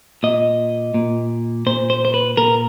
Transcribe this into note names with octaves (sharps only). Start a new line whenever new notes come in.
A#2 D#5
A#2
A#2 C5
C5
C5
B4
A#2 A#4